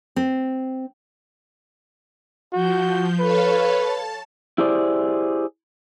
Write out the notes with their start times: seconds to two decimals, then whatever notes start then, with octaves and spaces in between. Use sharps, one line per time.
0.16 C4
2.53 F3 F#4 G6
3.19 A4 B4 C#5 F5
3.75 A5
4.58 E4 G4 G#4 C5 D5